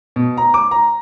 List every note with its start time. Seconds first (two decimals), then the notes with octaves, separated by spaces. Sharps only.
0.16 B2
0.37 A#5
0.54 D6
0.71 A#5